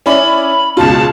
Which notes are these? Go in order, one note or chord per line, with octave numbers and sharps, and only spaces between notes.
C#4 E4 D5 B5
C#2 B2 F4 A5